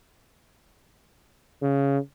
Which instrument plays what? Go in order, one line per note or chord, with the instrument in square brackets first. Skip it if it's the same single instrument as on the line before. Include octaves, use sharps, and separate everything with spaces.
[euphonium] C#3